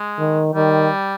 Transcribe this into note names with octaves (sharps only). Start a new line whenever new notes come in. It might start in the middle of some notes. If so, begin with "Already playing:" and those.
Already playing: G#3
D#3
D#3 G3